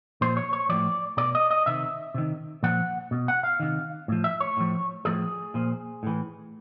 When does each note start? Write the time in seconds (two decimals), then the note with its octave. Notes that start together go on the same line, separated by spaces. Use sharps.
0.21 A#2 F3 C5
0.37 C#5
0.53 C#5
0.69 A2 F3 D5
1.17 B2 D5
1.35 D#5
1.51 D#5
1.66 C3 D#3 E5
2.14 C3 D#3
2.63 A#2 F3 F#5
3.11 B2
3.28 F#5
3.43 F5
3.60 C3 D#3
4.08 A2 F3
4.24 E5
4.40 C#5
4.57 A2 F3
5.05 A2 F3 G#4
5.54 A#2 F3
6.03 A2 E3